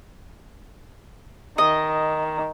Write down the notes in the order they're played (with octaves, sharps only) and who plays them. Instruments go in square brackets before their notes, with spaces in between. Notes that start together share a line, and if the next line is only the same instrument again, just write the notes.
[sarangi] D#3 [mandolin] D#5